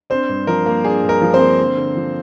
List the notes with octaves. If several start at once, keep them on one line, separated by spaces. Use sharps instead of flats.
C4 D4 C5
G2
F3 A#4
A#3
D4 G#4
G2
A#4
F3
C4 C5
A#3
D3
D3
F3